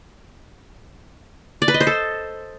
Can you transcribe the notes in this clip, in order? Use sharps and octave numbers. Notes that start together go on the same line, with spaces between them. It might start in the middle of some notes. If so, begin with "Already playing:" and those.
D5
B4
D#5
C5
A4